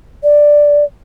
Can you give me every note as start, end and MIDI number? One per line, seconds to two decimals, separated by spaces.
0.23 0.84 74